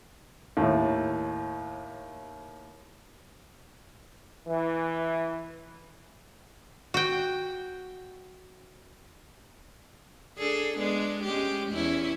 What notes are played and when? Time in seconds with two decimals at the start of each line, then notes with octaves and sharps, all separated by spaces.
0.57 D#2 A2
4.47 E3
6.94 F#4 G5
10.38 D4 G#4 A4
10.77 G#3 B3 D4
11.24 G#3 C#4 G4
11.72 E2 C#4 E4